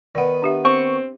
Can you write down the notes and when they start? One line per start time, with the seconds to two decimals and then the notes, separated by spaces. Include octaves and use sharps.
0.15 D#3 B3 D5 F#5
0.42 D4 G4 E5
0.65 C4 C#6